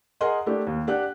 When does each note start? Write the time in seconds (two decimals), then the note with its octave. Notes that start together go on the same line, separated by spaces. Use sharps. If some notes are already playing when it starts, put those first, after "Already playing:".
0.21 G#4 A#4 D#5 F#5 C6
0.46 A3 D4 E4 G4
0.67 D#2
0.87 D4 G4 F#5 F#6